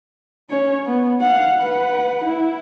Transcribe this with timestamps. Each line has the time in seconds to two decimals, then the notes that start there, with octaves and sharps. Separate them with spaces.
0.50 C#4 C#5
0.86 B3
1.21 F5 F#5
1.60 B4 F#5
2.24 E4